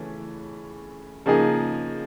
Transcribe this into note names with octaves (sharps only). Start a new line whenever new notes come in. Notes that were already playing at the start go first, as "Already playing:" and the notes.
Already playing: C#3 E3 A3 C#4
C#3 F3 A#3 D#4 G#4